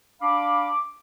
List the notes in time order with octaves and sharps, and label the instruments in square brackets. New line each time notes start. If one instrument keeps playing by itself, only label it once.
[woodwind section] D4 F5 B5 [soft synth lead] D6